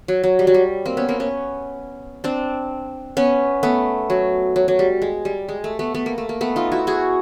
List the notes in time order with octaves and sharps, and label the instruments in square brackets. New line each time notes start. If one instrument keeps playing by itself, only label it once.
[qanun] F#3
F#3
G3
F#3
G3
A#3 C4
B3 C#4
A#3 C4
B3 C#4
C4 D4
B3 C#4
A3 B3
F#3
F#3
F#3
G3
G#3
G3
G#3
A3
A3 B3
A3 B3
A#3
A3
A#3
A3 B3
D#4 F4
E4 F#4
F#4 G#4